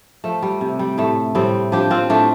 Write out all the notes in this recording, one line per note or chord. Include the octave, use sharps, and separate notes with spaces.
F3 A3
G3
C3
G3
A2 A3
A2 G3 C4
F3 D4 G4
C4 F4
A2 A3 D4